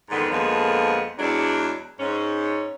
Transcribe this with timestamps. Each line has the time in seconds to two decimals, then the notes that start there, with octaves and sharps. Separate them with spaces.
0.10 F2 G#2 D3 D#3 B3
0.31 F2 D3 F3 G#3 A#3 B3
1.19 E2 F#3 G#3 D4
1.99 G#2 C#4